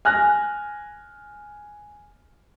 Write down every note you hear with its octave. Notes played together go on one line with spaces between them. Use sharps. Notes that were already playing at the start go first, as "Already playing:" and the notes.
G#5 F6 F#6 A#6